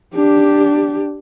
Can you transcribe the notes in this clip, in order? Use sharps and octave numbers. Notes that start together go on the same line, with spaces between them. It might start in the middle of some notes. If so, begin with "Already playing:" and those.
D4 G4